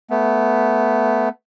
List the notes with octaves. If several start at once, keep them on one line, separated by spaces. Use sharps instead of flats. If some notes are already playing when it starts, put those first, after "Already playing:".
A3 B3